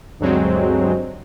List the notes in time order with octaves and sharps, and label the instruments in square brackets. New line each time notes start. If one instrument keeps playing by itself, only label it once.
[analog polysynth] D2 G2 F#3 G#3 C4